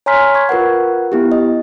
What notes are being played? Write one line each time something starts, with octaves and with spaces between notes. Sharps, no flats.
C#5 G#5 A#5 C6 F6 B6
C#6 G#6
F4 A#4 B4 F#5
B3 E4 G4
D#5